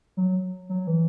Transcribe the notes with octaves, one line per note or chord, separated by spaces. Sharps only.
F#3
F#3
E3